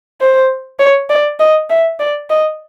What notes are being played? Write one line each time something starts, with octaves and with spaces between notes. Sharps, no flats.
C5
C#5
D5
D#5
E5
D5
D#5